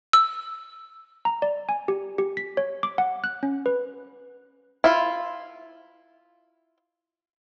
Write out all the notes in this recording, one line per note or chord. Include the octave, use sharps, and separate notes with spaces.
E6
A#5
D5
G#5
G4
G4
B6
C#5
D6
F#5
F#6
C#4
B4
E4 F4